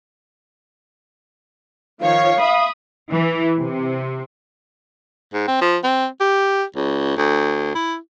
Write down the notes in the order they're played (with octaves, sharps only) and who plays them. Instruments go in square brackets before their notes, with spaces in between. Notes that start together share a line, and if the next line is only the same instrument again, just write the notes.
[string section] D#3 F3 C#5 [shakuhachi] F5
[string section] E5 B5 D#6
[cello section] E3
C3
[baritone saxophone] G#2
C4
F3
C4
G4
C#2
D2
E4